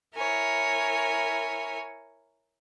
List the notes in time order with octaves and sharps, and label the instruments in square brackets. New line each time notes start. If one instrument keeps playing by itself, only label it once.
[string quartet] E4 A#4 C#5 G#5